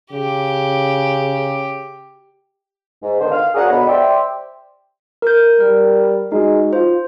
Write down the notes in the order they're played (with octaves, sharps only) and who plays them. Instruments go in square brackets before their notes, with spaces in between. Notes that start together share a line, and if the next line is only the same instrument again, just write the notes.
[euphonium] C#3 [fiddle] G4
[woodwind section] G#2
D3 D#3 B3 C5
F5
D2 D4 G#4 A#4 C#5 F#5
B2 D3 G#3 B3
G4 C5 D5 E5 G5
[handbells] A#4 G6
[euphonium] G3 [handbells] A#4
[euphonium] G#3 [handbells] D#4 F#4
[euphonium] F4 [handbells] C5